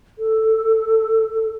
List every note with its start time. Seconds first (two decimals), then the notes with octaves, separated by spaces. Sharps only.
0.18 A4